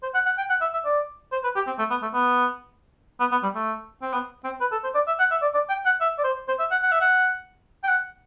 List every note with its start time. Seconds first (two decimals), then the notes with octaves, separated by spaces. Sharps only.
0.03 C5
0.14 F#5
0.26 F#5
0.38 G5
0.49 F#5
0.61 E5
0.73 E5
0.85 D5
1.32 C5
1.44 B4
1.55 G4
1.67 C4
1.79 A3
1.90 B3
2.02 A3
2.14 B3
3.20 B3
3.31 B3
3.43 G3
3.55 A3
4.02 C4
4.13 B3
4.44 C4
4.60 B4
4.72 A4
4.84 C5
4.95 D5
5.07 E5
5.19 F#5
5.31 E5
5.42 D5
5.54 D5
5.69 G5
5.85 F#5
6.01 E5
6.18 D5
6.24 C5
6.48 C5
6.59 E5
6.71 F#5
6.82 F#5
6.92 E5
7.01 F#5
7.84 G5
7.88 F#5